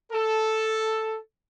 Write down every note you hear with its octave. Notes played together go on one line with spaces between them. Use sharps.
A4